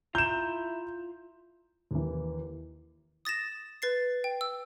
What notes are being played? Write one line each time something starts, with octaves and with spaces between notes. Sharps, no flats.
E4 F4 A#5 G6 E7
D#2 E3
D#6 A6 A#6 E7
B4 A6 C7
G5
E6